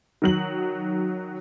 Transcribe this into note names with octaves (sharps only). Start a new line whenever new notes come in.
D#3 F#3 F#7